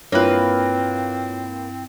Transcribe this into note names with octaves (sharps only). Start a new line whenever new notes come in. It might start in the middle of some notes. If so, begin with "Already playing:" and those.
G2 A#3 C4 E4 F4 A#4 B4 C#5